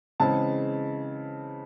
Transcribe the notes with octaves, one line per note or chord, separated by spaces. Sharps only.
C#3 E3 G#3 C4 A5